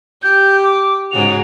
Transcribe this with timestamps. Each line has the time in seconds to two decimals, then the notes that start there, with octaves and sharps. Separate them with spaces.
0.23 G4 G6
0.64 D6
1.11 G#2 C#3 F#4 F7